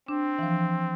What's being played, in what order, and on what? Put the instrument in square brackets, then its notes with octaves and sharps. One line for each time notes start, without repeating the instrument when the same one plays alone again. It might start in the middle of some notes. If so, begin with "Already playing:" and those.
[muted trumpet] C4 [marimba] D4
[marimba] E3
F3